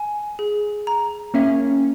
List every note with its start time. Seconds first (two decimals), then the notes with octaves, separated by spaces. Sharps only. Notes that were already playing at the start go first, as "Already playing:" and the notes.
Already playing: G#5
0.39 G#4
0.87 A#5
1.34 A#3 C#4 E5